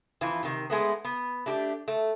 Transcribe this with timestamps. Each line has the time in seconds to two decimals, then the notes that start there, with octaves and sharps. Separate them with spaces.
0.21 F2 E3 F4
0.43 C3 D#3
0.70 G#3 A3 B3
1.04 B3
1.46 A3 D4 G4
1.88 A3